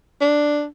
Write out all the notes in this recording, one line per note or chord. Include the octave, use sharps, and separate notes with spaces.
D4